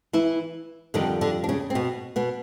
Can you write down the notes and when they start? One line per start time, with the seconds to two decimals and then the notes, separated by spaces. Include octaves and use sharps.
0.13 E3 E4
0.94 F2 D3 D#3 G3 D#4
1.21 D3 D4
1.44 D4
1.49 C#3 C#4
1.70 C4
1.75 B2 B3
2.16 B2 B3